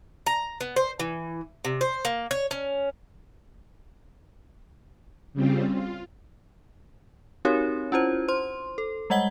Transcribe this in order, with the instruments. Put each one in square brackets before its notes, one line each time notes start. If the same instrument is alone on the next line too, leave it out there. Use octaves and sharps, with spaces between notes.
[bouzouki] A#5
B3
C5
E3
C3
C5
A#3
C#5
C#4
[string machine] C#3 G3 C4 F4
F4
[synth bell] C4 D#4 F#4 G4 A#4 C#5
C#4 E4 F4 C5
C5 C6
A4
G3 G#3 D#5 F#5 G#6 G7